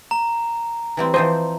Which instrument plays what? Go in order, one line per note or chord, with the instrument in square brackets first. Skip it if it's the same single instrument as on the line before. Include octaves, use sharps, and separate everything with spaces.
[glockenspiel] A#5
[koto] E3 G3 C4
[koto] E3 F3 D#5 [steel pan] C5